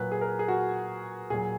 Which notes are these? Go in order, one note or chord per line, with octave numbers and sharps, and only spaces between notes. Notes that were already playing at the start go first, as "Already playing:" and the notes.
Already playing: A#2 F#3 B4
G#4
A#4
G#4
F#4
A#2 F#3 G#4